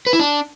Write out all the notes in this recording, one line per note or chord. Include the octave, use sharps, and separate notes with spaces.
B4
E4
D4